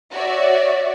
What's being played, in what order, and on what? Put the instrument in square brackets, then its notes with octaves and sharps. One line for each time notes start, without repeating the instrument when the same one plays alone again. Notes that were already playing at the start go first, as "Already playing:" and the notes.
[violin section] F#4 C#5 D5 E5